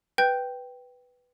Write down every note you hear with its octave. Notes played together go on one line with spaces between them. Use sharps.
B4 G5 G6